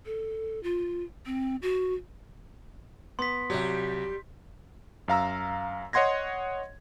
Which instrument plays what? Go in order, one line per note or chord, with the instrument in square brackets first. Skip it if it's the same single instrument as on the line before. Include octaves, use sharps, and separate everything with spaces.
[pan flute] A4
F4
C4
F#4
[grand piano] B3 [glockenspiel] C6 B6
[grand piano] C2 F#3 [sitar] G3 G4
[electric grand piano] F#2 F5 A#5 E6
C#5 D#5 F#5 C6 G#6 A#6